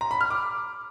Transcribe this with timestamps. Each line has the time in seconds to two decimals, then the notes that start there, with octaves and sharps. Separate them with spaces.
0.01 A#5
0.11 B5
0.21 F6
0.30 D6